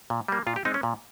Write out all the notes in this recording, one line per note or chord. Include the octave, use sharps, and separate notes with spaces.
A#2
G3 A#3
A#2 F4
G4
G#3 C4 D#4
C#4
A#2